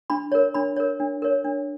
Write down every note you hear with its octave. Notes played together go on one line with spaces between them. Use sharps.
D4 B5
A#4 C#5
D4 B5
A#4 C#5
D4
A#4 C#5
D4